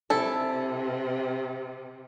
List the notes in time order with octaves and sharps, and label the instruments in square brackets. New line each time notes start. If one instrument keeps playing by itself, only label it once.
[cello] C3 [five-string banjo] E4 A4